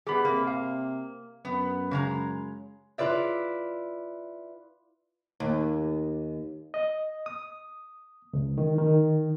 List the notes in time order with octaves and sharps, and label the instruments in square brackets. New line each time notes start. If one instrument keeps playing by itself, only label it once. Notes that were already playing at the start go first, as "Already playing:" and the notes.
[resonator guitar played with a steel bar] G3 B3 [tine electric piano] G#4 B5
[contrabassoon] C3 [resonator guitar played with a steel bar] A#3
[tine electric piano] F5
[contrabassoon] F#2 [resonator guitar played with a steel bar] B3
[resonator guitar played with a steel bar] C#3 G#3 A#5
[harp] E4 F4 B4 D5 E5
[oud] D#2
[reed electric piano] D#5
D#6
C#2
D#3
D#3